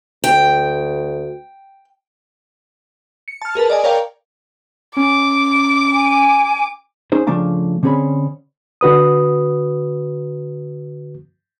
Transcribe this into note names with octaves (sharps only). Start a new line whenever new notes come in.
D2 G5
C#7
A5 F6
G#4 A#4 B4 A5
D5 D#5 G#5
A#4 C#5 D5 F5 G5 A#5
C#4 D6
G#5
C#4 D#4 G#4 C5
C#3 F3 A3 D4 F5 A#5
D3 C4 C#4 G#4 C#5 B5
D3 F#4 B4 D#6